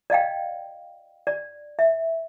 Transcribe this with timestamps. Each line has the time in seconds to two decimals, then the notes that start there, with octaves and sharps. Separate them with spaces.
0.10 D5 D#5 F5 G5
1.27 D5
1.79 E5